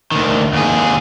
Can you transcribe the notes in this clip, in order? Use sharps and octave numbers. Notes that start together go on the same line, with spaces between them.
D2 D#3
D#2 G#4